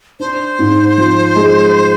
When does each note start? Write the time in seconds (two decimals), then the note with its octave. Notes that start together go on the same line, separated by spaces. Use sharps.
0.20 D4 C5
0.59 G#2
0.98 F3
1.36 G#3